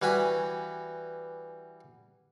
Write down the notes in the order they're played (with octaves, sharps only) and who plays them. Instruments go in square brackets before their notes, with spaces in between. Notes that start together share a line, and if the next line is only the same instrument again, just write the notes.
[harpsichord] E3 G3 F#4 F#5 G#5 B5